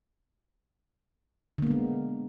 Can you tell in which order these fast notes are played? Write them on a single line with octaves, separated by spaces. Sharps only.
D3 A#3 B3 G#3